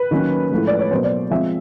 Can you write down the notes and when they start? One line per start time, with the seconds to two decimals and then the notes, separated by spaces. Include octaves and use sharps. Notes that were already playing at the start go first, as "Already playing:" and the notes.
Already playing: B4
0.11 D#3 F#3 A#3 C#4
0.51 A2 F3 G#3
0.67 D5
0.79 C#5
0.91 B2 F#3 A#3 C5
1.04 D5
1.31 F3 G#3 C4 E5